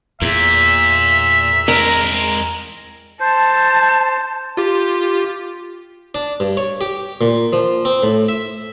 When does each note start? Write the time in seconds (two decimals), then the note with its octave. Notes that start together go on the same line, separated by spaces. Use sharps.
0.22 E2 A#2 E5
1.68 G#3 C4 A#4
3.20 C5 A5
4.57 F4 G4
6.15 D4
6.40 G2
6.57 C#5
6.81 G4
7.21 A#2
7.53 F3
7.85 C4
8.03 A2
8.29 E5